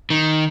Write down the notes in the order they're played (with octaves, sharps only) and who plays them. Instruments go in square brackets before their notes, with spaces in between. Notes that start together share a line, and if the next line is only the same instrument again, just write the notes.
[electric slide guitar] D#3